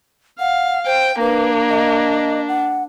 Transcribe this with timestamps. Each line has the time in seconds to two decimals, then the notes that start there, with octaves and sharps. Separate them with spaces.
0.39 F5 F#5
0.86 C5 G5
1.20 A#3 D4 B4
1.70 D#5
2.48 F#5